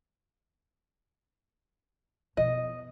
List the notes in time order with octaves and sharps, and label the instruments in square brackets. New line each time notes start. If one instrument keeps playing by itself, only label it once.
[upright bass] B2 F3 [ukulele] D#5